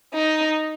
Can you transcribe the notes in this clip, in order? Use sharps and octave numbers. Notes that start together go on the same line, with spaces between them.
D#4